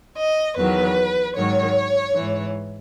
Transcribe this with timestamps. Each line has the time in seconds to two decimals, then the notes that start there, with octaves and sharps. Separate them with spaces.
0.17 D#5
0.57 E2 D#3 F#3 B4
1.36 G#2 D#3 F#3 C#5
2.15 G#2 E3